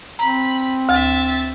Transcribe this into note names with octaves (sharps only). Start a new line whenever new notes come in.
C4 A#5 B5
D2 E5 A6